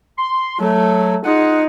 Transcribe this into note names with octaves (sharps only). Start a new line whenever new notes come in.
C6
F#3 A3
D#4 F4 G#4 F#5